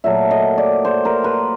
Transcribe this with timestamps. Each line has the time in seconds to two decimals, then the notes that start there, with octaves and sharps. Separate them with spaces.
0.04 A#2 F#3 A3 E5
0.31 D#5
0.58 D5
0.85 C5
1.05 A#4
1.24 B4